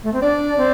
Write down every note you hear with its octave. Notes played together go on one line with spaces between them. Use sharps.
A3
C4
D4 D5
C4